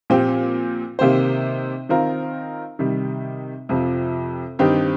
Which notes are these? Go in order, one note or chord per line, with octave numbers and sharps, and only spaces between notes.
A#2 F3 C4 G4
C3 D#3 A#3 G4 C5
D#3 C4 F4 A#4
C3 D#3 G3
F2 C3 F3
G2 D#3 C4 D#4 G4